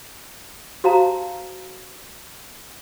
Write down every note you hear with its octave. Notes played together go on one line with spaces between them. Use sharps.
F#4 C5 F5 A5 A#5